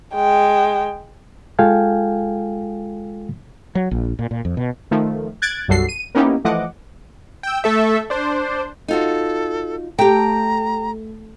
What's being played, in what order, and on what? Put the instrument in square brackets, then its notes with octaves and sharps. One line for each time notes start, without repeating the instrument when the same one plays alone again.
[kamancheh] G#3 G5
[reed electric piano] G#3 F4 A4 F5 G5 G#5
[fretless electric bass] F#3
A#1
A#2
A#2
F2
B2
[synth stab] D#3 F3 A3
F#6 G#6 A6 D7
B1 F#2 G3 F#4 A4 C7
D#7
A#3 B3 C#4 D#4 E4 G4
E3 F3 A3 D#5 F#5 D6
[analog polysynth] G5 E6
A3 A4 E5
D4 C5
[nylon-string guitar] D#4 F4 F#4 [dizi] A4
[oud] A3 [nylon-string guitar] G4 G5 [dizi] A#5